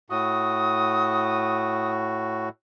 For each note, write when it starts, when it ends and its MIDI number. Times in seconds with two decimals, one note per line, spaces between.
0.10 2.49 45
0.10 2.49 66
0.10 1.92 87